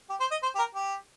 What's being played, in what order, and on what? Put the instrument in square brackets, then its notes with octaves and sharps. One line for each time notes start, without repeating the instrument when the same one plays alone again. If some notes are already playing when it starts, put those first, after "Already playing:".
[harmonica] G4
C5
D#5
C5
G4
A#4
G4